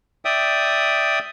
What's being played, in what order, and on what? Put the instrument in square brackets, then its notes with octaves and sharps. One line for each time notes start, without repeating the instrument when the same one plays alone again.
[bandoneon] D5 E5 G5 D#6